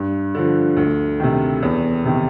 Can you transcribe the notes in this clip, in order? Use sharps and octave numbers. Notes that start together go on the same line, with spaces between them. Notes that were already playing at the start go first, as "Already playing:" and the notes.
Already playing: G2
D3 F3
D2
C3 D#3
E2
C3 D#3